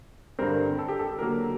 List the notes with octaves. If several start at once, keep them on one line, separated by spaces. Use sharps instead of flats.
G2 D3 G3 C4 A#4
A4
G4
A4
D3 F#3 A#3 A#4